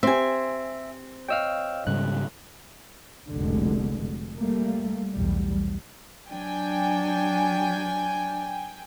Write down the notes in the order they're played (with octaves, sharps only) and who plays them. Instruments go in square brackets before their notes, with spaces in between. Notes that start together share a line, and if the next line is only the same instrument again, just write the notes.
[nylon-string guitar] C4 G#5 [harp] G4 C6 [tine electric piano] E5
[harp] C#5 D#5 F5 [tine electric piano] G5 E6 F6
[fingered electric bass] G#2 C#3 G3 [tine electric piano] F#6
[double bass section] F1 C2 B2 D3 G#3
G3 A3 A#3
B1 E2 A2 G3
[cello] F#3 D4 [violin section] G5 G#5